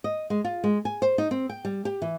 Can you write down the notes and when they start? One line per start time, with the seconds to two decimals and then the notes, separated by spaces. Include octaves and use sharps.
0.04 D#5
0.30 G#3
0.44 F4
0.64 G#3
0.85 G#5
1.02 C5
1.18 D#4
1.31 C4
1.50 G5
1.65 G3
1.85 G4
2.02 E3